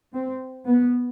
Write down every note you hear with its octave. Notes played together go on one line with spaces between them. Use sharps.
C4
B3